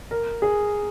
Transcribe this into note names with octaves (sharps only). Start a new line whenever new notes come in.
A#4
G#4